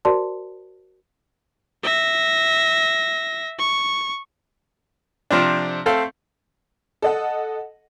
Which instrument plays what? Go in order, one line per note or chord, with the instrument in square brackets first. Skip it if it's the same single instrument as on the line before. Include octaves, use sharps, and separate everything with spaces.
[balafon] F#4 A#4 C5 D5 A5 C6
[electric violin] E5 A#6
C#6
[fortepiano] C3 F3 C4 D4
A3 C4 A4 F5
[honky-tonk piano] A4 D#5 F#5